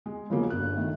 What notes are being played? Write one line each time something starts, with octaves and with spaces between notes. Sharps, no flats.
G#3
C#3 F3 F#3 G#3 A#3
G1 F#6
D#3 A3